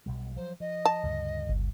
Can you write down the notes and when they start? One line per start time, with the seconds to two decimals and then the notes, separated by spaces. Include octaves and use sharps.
0.06 B1 B2 G3
0.36 F3 F#3 C5
0.60 F3 D#5
0.85 A5
1.03 D2 G2 C#3
1.49 G1